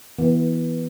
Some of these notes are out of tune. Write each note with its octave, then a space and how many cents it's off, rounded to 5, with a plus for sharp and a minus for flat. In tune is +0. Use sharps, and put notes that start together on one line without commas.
E3 -10 B3 -20